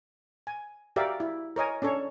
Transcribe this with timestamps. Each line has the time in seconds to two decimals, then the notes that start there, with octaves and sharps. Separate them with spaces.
0.47 G#5
0.96 F#4 G4 A#4 D5 E5 F5
1.20 E4
1.56 A#4 C#5 D#5 G#5
1.82 C#4 D4 A4 C#5